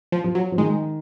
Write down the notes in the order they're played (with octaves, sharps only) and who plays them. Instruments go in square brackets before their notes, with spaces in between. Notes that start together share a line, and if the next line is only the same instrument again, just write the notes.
[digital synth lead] F3
[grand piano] F3
[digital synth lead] F#3
[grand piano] F3
[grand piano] D#3 [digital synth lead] G#3